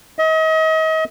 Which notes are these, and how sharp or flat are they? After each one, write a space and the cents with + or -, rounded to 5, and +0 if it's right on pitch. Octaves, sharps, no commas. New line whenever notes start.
D#5 +35